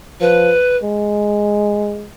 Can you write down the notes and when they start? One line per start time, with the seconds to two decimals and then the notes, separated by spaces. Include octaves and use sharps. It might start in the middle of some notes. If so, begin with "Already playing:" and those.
0.21 F3 B4
0.83 G#3